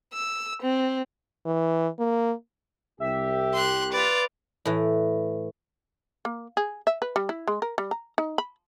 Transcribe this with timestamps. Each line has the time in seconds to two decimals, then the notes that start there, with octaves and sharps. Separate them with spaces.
0.13 E6
0.62 C4
1.46 E3
1.99 A#3
3.00 C2 G4 E5
3.54 C6 F#6
3.93 F4 B4 D5
4.65 A2 E3
6.25 A#3
6.57 G#4
6.87 E5
7.02 B4
7.16 G3
7.29 E4
7.48 G#3
7.62 A#4
7.78 G3
7.91 A#5
8.18 D#4
8.38 B5